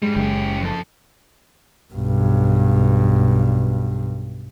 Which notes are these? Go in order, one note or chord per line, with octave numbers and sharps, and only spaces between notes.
G#2 G3 G#3
F#1 C#4 G4
F2 A4
B1 G2